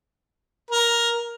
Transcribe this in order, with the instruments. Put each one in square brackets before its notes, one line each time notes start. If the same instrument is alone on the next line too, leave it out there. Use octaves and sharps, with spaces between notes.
[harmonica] A#4